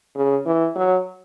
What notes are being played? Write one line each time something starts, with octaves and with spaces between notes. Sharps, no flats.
C#3
E3
F#3